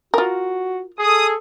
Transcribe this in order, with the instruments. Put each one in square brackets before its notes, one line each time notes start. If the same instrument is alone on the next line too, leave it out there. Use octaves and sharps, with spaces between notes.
[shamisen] F4 A#4 [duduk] F#4
[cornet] G#4 [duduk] A4 [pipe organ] D#6